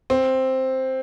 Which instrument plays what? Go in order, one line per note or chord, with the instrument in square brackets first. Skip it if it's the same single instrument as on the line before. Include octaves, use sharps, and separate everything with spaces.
[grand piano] C4